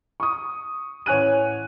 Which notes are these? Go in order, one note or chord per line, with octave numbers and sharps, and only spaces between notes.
C#6 D#6
A1 C#5 G#5 F#6 D#7